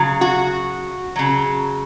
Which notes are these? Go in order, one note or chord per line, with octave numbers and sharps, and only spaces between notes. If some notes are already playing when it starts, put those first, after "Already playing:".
Already playing: C#3 F#3
F#4
C#3 F#3